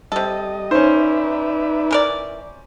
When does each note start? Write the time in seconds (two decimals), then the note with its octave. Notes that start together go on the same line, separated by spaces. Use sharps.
0.12 C3 G3 A4 D#5
0.71 C#4 D#4 B4 C5 D5 E5
1.91 E3 A#4 D5